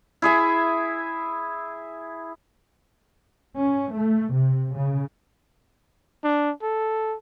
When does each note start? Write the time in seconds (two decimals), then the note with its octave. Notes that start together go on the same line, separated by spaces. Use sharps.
0.22 E4 G#4 E5
3.58 C#4
3.95 A3
4.34 C3
4.76 C#3
6.24 D4
6.63 A4